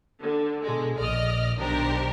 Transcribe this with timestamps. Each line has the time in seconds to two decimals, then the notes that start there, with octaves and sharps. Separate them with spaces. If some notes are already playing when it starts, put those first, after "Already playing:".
0.22 D3
0.63 B2 D3 G#3
0.96 A#1 D5 D#5 F6
1.56 B1 D#3 D4 G4 A#4 C5